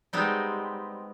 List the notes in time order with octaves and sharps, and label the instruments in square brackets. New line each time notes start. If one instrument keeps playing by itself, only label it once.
[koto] G3 G#3 B3 C4 D#4